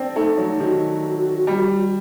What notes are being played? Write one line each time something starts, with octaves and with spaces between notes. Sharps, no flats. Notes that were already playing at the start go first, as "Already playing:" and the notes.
Already playing: C4 D4
A3 D#4
F#3
D#3 F#4 G4
G3